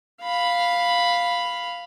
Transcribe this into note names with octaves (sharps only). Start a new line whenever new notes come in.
F5 B5